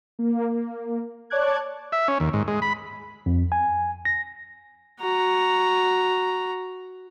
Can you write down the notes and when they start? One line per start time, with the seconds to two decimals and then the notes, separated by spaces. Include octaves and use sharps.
0.19 A#3
1.30 C#5 D5 A5 D6 F#6 G#6
1.92 E5
2.08 C#4
2.20 D#2
2.33 G#2
2.48 G#3
2.62 B5
3.26 F2
3.52 G#5
4.05 A#6
5.00 F#4 A#5